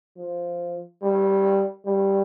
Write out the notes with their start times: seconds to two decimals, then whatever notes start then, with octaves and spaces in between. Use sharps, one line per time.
0.17 F3
1.02 G3
1.85 G3